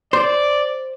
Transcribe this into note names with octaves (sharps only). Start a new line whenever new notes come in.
C5 D5